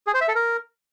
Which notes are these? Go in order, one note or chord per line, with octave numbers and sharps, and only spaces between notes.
G#4
C5
E5
A4
A#4